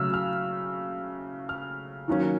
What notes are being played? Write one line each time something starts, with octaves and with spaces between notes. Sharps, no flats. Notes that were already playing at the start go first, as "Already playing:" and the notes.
Already playing: C#3 F#3 A3 E6 F6
F6
F6
D#3 F#3 A#3 C#4